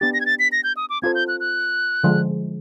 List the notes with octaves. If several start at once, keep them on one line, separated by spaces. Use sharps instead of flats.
B3 D4 G4 A6
A#6
G#6
A6
B6
A#6
G6
D#6
D6
C4 F4 A4 C5 G#6
G6
F#6
F#6
D3 F3 G#3